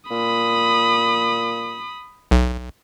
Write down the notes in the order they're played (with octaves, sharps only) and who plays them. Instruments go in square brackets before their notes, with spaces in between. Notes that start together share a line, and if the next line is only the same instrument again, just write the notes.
[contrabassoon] A#2 [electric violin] B5 D#6
[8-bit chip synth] B1